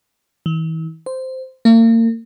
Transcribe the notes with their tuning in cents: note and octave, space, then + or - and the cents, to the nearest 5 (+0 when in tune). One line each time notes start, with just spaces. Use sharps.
E3 -40
C5 -10
A#3 -40